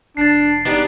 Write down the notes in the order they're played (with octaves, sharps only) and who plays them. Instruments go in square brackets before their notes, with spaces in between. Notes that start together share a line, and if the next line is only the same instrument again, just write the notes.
[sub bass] F1 [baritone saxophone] D4 [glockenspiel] A6 C7
[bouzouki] B3 D4 G4 [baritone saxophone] D#4